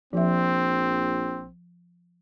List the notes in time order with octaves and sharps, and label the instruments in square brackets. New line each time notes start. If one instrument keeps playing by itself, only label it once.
[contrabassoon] A#1 [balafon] F3 E5 [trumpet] C4